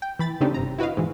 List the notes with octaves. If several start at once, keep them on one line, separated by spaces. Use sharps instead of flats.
G5
E3 B5 A6
C#3 A3 C4 D4 D#4 G4
G1 C3 A#5
E4 F#4 B4 D#5 F5
G#2 B2 E3